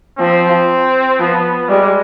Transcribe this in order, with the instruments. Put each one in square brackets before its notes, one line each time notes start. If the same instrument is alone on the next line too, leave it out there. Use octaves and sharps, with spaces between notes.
[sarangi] F3 [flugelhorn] C4
[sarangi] F3 [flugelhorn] B3
[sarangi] G3 [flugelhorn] G#3